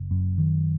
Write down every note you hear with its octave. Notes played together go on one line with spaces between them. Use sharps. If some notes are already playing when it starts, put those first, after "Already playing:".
Already playing: F#1
F#2
D#3